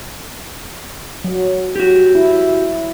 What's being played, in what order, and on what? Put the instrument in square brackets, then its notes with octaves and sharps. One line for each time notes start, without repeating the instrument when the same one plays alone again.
[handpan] F#3
[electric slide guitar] F#4 G4
[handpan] E4